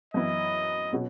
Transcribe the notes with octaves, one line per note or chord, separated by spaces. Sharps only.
F#2 E3 B3 E4 D#5
B2 F#3 C#4